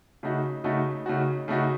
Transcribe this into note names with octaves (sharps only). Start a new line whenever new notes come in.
C#3 A3 D#4 F#4
C#3 A3 D#4 F#4
C#3 A3 D#4 F#4
C#3 A3 D#4 F#4